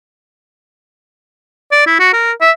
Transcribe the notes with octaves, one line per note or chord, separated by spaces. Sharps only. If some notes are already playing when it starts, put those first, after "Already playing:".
D5
E4
F#4
A#4
E5